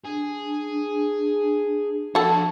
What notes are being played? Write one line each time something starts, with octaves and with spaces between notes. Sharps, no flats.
D4 G#4
F3 F#4 A4 F#5